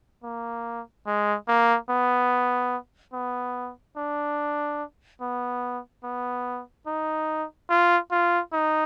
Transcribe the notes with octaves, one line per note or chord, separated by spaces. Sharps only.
A#3
G#3
A#3
B3
B3
D4
B3
B3
D#4
F4
F4
D#4